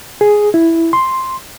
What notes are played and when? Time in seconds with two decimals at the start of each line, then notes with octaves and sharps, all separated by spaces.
0.21 G#4
0.54 E4
0.93 C6